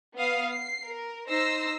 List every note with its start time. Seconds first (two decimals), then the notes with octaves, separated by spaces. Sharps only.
0.17 B3 F5 D#6 C7
0.49 C7
0.85 A#4
1.30 D#4 C5 E6 A#6 C7